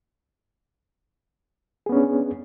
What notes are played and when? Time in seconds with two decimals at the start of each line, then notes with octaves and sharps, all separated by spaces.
1.86 G#4
1.89 B3
1.92 C#4
1.95 D4